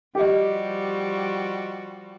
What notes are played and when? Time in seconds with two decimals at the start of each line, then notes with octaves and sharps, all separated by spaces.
0.15 F3 G3 F#4 G4 D#5